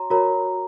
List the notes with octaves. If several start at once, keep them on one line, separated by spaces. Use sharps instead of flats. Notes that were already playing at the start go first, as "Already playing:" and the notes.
Already playing: F#4 C#5 A#5 C6
F#4 A#4 C#5 A#5